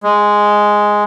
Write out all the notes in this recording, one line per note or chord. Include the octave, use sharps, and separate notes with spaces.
G#3